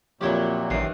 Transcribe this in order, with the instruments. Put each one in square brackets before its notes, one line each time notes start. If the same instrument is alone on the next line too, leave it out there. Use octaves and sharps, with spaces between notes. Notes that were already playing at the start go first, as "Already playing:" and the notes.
[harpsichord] F2 C#5 [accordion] A#2 [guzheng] F#3 E4 G4
[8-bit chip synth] A1 C7 [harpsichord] F#2 [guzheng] D#3 E3